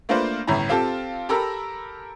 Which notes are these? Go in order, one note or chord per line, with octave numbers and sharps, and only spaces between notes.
A3 A#3 D4 F4 B4 C5
G1 A2 C#4 E4 A#5
C4 F4 G4 A4 A5
G4 A4 A#4 A#5 B5 E6